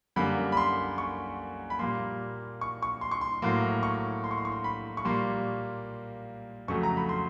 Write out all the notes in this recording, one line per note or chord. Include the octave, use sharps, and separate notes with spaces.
F#2 D3 G3 A#3 B5
B5
C6
C#6
B5
A#2 G3 A#3 C6
C#6
C#6
C6
C#6
C6
A2 F#3 A#3 C6
C#6
C6
C#6
C6
C#6
C6
B5
C#6
A#2 G3 A#3 C6
F2 C#3 F#3 A3 C#6
A#5
B5
C6